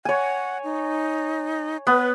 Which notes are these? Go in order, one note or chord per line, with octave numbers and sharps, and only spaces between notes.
C#5 F#5 G#5
D#4
B3 B4